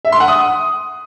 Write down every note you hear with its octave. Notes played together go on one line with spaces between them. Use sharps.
E5
C6
F#5
D#6